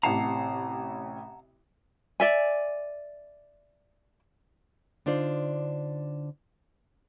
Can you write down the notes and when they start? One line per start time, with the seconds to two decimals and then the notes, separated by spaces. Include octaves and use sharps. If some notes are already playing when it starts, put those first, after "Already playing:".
0.03 A1 C3 F#5 A5 A#5 C7
2.20 D5 E5 G#5
5.06 D3 D4 D#4 F4 C5 D5